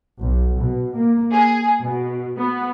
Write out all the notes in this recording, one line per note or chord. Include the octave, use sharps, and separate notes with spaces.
B1
B2
A#3
G#4
B2
B3